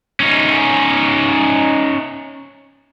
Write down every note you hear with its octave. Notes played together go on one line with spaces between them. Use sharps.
C#4 D#4